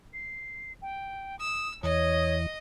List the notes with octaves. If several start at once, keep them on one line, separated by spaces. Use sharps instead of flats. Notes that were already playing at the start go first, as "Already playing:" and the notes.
C7
G5
D#6 E6
E2 E3 C#5 D#5 D#6